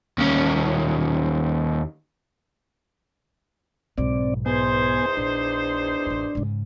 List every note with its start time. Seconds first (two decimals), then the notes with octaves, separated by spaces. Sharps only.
0.18 D#2 C#4
3.98 B1 G#2 C4 D5
4.46 E2 B3 D#4 C5 G#5
5.17 A#1 D4
6.06 A1 F2
6.35 G#2 C#3